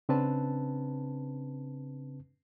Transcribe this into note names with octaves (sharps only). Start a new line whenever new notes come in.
C#3 C4 D4 B4 A5